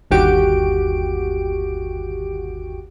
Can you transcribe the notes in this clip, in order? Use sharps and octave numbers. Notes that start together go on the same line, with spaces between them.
G1 D#2 F#4 G4 D7